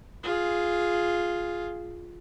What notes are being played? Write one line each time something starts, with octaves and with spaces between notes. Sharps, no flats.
F4 G#4